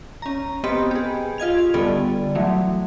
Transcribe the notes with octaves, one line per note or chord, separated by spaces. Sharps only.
C#4 A#5
B3 C4 G4 D#5 B5
G4 G#4
F4 D#5 G#6 F7
D3 G3 B3 A4 D5
E3 F#3 A3